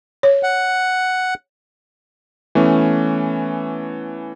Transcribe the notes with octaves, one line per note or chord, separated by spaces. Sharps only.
C#5
F#5
E3 A3 B3 C#4